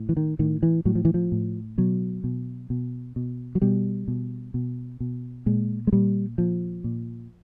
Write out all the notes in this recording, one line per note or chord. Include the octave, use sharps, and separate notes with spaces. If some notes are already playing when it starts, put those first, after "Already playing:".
Already playing: A2
E3
D#3
A2 D#3
E3
A2 F#3
F3
E3
F3
A2
B2 F#3
B2
B2
B2
F#3
B2 G3
B2
B2
B2
A#2 G#3
G#3
A#2 G3
A#2 F3
A#2